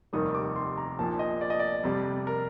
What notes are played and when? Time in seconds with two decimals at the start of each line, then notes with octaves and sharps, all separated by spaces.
0.13 F1 D#2 D#3 G3 D#6
0.35 D6
0.56 C6
0.77 A#5
0.99 A#1 A#2 F3 A5
1.19 D#5
1.41 D5
1.50 D#5
1.60 D5
1.84 F2 C3 G3
2.27 A#4